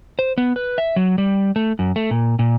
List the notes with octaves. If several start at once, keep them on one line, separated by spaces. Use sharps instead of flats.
C5
B3
B4
E5
F#3
G3
A3
F#2
A3
A#2
A#2